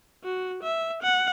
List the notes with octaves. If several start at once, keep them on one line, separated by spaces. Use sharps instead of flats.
F#4
E5
F#5